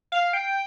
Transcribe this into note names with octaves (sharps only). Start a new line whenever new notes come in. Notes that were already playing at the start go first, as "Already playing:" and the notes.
F5
G5